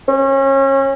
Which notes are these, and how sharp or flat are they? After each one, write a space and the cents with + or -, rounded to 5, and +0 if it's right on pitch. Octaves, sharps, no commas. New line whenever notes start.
C#4 -30